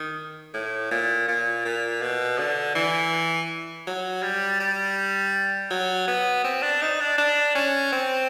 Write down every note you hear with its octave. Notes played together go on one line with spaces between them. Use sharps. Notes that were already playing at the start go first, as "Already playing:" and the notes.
Already playing: D#3
A2
A#2
A#2
A#2
B2
D3
E3
F#3
G3
G3
F#3
B3
C4
D4
D#4
D4
D4
C#4
C4